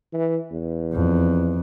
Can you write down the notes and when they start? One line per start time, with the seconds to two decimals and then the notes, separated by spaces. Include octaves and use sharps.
0.13 E3
0.52 E2
0.93 F2